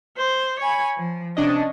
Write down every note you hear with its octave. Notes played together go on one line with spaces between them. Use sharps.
C5
C#5 G#5 B5
F3
C3 C#4 D4 D#5